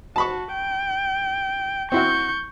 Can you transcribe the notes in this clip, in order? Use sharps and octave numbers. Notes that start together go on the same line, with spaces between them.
F#4 A5 B5 C#6
G5
C4 E4 F#4 C#6 G6